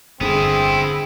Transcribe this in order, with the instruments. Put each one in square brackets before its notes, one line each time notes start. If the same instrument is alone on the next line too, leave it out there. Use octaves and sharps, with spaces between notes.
[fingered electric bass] G1 D3 [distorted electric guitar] B3 E4 [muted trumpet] C4 [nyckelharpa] G#4